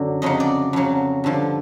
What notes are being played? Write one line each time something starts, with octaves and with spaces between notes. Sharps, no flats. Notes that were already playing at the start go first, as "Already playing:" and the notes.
Already playing: F#2 D3 F#3
F2 C#3 F#3 D#5
D5
F2 C#3 F#3
G2 D3 F3